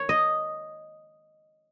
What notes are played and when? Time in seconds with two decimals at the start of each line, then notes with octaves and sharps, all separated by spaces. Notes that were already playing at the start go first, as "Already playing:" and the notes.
Already playing: C#5
0.09 D#5